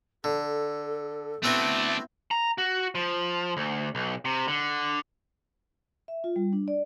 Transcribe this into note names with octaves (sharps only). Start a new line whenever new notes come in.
D3 A4
A3 B3 C4 D4 E4 F#4
A#5
F#4
F3
D2
B1
C3
D3
E5
F4
G3
D4
D5